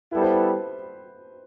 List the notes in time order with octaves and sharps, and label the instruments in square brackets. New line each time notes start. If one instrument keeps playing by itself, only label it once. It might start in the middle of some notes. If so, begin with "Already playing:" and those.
[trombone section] G3 B3 E4 A4 [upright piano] B4
[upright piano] C5
B4